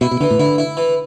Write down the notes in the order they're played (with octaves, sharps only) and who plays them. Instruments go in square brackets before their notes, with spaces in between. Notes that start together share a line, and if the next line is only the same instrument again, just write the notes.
[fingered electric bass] B2 [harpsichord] E4
[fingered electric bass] B2
[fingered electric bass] D3 [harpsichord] E3
[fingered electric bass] A2
[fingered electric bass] D3 [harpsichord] E4
[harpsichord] E4
E3